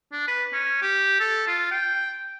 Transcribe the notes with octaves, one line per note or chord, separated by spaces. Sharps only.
D4
B4
C#4
G4
A4
F4
G5